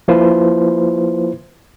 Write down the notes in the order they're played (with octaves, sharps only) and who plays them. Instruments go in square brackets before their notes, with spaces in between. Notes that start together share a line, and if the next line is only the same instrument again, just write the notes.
[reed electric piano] F3 A#3 E4 F4 B4 C5